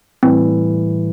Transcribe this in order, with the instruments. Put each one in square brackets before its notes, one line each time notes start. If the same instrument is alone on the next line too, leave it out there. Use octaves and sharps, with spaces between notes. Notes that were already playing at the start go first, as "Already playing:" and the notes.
[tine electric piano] A2 E3 G3 [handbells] C4